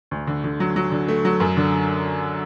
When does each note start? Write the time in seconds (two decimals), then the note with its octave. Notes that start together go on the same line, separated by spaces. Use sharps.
0.11 D2
0.27 D3
0.44 D3
0.60 F#3
0.76 F#3
0.92 D3
1.08 A3
1.25 F#3
1.40 F#2
1.57 D3